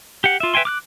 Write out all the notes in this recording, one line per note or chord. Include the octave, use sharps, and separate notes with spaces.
G4 F#5
F4 E5
B4 E5 G5 G#5 C6
D6 F6 F#6